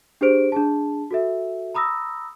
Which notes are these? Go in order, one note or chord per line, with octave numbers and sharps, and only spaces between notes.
D4 G4 G#4 C5 D7
D4 G#4 A5
F#4 A4 E5
A#5 B5 D#6 E6 A#6